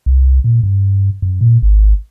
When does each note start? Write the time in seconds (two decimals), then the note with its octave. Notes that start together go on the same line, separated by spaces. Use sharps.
0.06 C2
0.44 A#2
0.63 G2
1.22 F#2
1.41 A#2
1.62 G#1